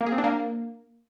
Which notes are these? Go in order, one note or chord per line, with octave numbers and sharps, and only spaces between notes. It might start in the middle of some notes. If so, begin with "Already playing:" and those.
A#3
G#4
C4
D4
A#3